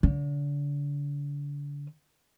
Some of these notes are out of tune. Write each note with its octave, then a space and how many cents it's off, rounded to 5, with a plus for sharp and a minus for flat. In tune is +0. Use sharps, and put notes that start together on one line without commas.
D3 -35